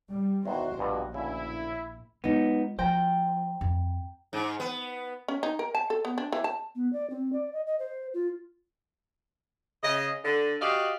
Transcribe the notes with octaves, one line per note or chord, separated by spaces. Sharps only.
G3
E2 D#3 F#4 C5
A#1 G2 B2 A#3 F4 F#4 D#5
D2 C#3 E4
G#3 B3 D#4 F4
F3 C5 G5 A#5
F2
G#2
B3
C#4
D#4
A#4
A5
A4
B3
D4
E3
A5
B3
D5
C4
D5
D#5
D#5
C5
F4
C#3 D#5
D3
F#4 G4 D5 D#5 F5